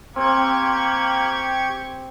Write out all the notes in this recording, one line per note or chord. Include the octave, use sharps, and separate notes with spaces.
A#3 C4 G4 C#6 G#6